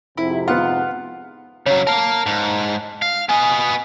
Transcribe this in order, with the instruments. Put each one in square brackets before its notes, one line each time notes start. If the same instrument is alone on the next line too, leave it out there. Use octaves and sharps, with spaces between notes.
[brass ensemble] F2 G#2 C3 [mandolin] E4
[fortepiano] B3 F4 [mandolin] F#5
[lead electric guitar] C#3 F#3 [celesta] C#5
[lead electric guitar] A#4 F5 [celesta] A5
[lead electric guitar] G#2
F5
[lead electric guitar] B3 D#5 [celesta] G#5